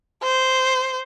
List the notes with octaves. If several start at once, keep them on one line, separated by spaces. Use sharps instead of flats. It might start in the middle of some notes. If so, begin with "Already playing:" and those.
C5